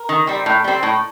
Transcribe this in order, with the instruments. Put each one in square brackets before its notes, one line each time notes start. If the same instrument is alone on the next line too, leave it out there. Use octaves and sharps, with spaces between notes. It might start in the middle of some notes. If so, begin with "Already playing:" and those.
Already playing: [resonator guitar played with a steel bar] A#4
D#3
G3 C4
A2
G3 C4
A2